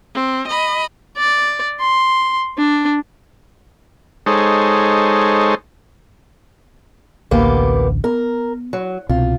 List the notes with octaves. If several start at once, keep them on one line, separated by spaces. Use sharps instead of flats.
C4
D#5 B5
D5
C6
D4
G#3 D#4 A4 C5 C#5
A1 D2 A#3 B3 G4
B3 A#4
F#3
C2 B2 C4 F4